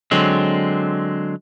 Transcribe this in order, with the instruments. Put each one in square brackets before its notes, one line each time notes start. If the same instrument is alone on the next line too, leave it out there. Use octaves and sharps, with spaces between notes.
[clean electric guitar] D3 F#3 G#3 C4